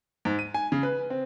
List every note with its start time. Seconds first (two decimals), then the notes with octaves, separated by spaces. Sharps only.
0.25 G#2
0.39 D#7
0.54 G#5
0.72 C#3
0.83 B4
1.10 C4